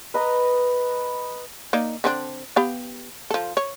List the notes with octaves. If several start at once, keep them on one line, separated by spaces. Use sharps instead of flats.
B4 D#5 A#5
A#3 D#4 D5
D3 C4 D4
B3 G4 F5
F3 A4
C#5